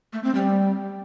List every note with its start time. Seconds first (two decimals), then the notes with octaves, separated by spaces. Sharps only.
0.13 A3
0.24 C4
0.35 G3